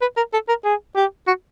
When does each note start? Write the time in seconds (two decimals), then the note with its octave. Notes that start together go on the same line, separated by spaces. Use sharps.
0.01 B4
0.17 A#4
0.33 A4
0.48 A#4
0.65 G#4
0.96 G4
1.27 F#4